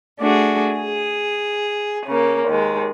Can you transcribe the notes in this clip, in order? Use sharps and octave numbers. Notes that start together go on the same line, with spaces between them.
A3 D4 F#4 G#4
G#4
C#3 A#3
D#2 G#3